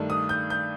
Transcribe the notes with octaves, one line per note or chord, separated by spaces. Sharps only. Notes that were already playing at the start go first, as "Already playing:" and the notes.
Already playing: G2 D#3 A3 D4
D#6
G6
G6